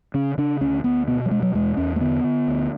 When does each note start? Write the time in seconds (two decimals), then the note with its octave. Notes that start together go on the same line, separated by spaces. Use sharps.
0.14 C#3 C#4
0.38 C#3 D4
0.61 D2 C#4
0.84 D2 B3
1.08 B2 B3
1.26 F#3
1.31 B2 G#3
1.42 F#3
1.55 E2 G#3
1.77 E2 C#4
1.96 A3
2.01 D3 B3
2.24 D3
2.47 D2